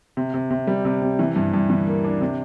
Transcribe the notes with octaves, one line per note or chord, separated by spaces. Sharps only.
C3
C3
C3
G3
C3
C3
E3
G2
G2
E3
A#3
D4
C3